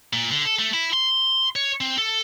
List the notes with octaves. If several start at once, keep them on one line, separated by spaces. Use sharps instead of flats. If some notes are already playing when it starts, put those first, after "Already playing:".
A#2
D3
A4
A3
E4
C6
C#5
C4
A4